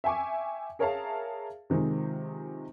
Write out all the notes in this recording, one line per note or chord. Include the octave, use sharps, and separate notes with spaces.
E5 G5 G#5 C#6 D6
G#4 A#4 C#5 E5 F5 A5
C3 D#3 F3 G#3